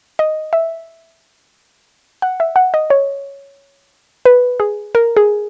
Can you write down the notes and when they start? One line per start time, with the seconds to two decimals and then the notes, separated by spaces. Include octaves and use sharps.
0.19 D#5
0.53 E5
2.22 F#5
2.40 E5
2.56 F#5
2.74 D#5
2.90 C#5
4.25 B4
4.60 G#4
4.95 A#4
5.17 G#4